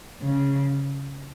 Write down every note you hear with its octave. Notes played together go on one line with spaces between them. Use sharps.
C#3